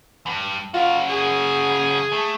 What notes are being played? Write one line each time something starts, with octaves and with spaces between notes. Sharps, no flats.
E2 G2
C#3 F4 F#4
G#4
A3